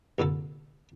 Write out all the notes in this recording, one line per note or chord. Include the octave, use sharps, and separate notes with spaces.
C2 A#2 D3 A4